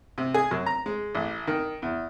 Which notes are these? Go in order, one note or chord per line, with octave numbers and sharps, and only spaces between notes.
C3
G#4
F#2
A#5
G#3
A1
D#3
E2